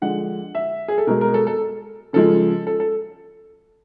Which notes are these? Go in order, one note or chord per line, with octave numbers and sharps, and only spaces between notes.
D3 F3 G#3 F#5
E5
G#4
A4
B2 G#3 A#4
A#4
A4
A4
C#3 F3 G#3 A4
A4
A4